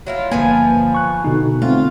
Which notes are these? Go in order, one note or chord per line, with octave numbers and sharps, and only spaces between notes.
F#3 E4 F4
G1 F3 A#3 B3 G#5
C#6 F#6
B2 D3 D#4
A3 B3 C4 F4